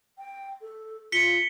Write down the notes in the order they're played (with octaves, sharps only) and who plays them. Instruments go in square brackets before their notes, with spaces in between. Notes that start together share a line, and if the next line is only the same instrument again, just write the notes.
[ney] G5
A4
[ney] F4 [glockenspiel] B6 C#7 G7